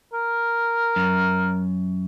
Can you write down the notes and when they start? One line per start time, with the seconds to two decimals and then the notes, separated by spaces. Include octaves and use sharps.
0.14 A#4
0.96 F#2